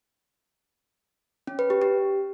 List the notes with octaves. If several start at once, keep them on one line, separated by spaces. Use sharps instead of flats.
C#4
B4
G4
G4